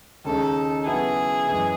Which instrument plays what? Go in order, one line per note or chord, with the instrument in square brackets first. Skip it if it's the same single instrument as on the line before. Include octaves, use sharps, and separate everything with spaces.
[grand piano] D#2 C#3 G#3 D#4 [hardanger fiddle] A4
[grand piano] C#3 F#3 B3 E4 [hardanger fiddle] G#4
[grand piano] F#2 E3 G#3